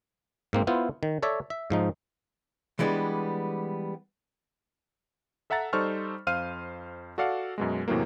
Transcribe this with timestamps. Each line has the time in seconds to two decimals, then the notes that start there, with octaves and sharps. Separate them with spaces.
0.53 G#2 A#3 C4
0.67 B3 E4 F4 C5
1.03 D#3
1.23 A4 C#5 D5 E5
1.50 E5
1.70 G#2 F3 D#4
2.79 E3 G3 G#3 B3 D4
5.50 A4 E5 F#5 A#5 A6
5.73 G3 D#4 A4 C5 C#6 F6
6.27 F2 C5 F5 F6 D#7
7.18 F#4 A4 D5 F5 F#5
7.58 F#2 B2 G#3
7.88 E2 A2 C3 E3 F#3 A#3